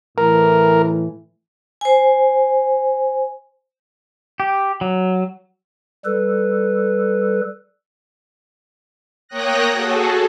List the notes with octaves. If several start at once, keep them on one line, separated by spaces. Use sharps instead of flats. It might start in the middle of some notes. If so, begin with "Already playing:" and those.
A2 E3 A#4
C5 G#5
G4
F#3
G3 A4 B4
A#3 C#5 G5 D#6 F#6 A#6
F#4 G#4 A4